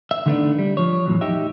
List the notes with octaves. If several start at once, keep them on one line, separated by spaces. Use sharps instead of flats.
E5
D3 D#3 A3 B3 C#4 D4
G3
F3 C#5
E2 A2 C3 F#3
D#4 G4 E5